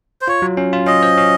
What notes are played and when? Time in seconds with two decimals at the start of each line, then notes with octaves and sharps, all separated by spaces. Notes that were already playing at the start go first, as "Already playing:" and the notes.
0.21 C5
0.28 F4 C#5
0.42 F#3
0.57 C#4
0.73 F4
0.87 C#4 D#5
1.03 C5
1.17 C#4